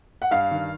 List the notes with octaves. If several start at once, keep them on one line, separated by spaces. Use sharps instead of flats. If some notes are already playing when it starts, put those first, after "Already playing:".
F#5
G2 F5
D#3